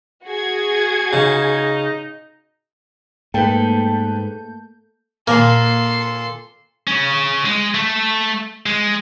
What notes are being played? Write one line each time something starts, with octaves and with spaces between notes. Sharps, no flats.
F#4 G#4 G#6
C#3 D#4
G#2 A3 A#3 A4 B4 G5 G6
A#2 A#3 A4 C6
C#3 C#4
G#3
A3
G#3